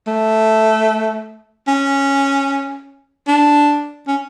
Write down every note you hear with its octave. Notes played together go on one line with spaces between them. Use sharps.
A3
C#4
D4
C#4